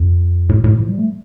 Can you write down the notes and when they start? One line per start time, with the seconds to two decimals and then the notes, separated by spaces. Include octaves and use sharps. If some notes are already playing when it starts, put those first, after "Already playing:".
Already playing: F2
0.49 A2
0.64 A2
0.79 F3
0.88 G3
0.98 A3